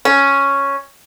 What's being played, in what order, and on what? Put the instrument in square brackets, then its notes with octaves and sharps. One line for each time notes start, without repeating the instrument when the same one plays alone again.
[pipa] C#4